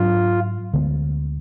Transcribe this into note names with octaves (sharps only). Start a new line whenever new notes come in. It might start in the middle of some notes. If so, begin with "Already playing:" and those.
Already playing: G#2 F#3 D4 F4
D2 D3 G#3 B3